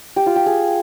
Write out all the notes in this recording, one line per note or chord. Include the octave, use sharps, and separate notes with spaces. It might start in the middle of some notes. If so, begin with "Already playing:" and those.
G4
F4
G4
G#4